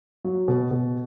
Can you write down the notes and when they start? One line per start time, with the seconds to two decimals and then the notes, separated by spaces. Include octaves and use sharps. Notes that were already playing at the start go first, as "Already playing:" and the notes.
0.24 F#3
0.48 B2
0.71 B2